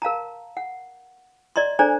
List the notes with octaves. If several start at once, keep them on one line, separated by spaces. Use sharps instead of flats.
A#4 F5 A5 A#5
F#5
D5 D#5 A#5 C6
D4 A4 C5 D5 G#5 A#5